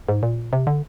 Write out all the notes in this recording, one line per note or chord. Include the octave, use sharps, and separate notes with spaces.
G#2
A#2
C3
D3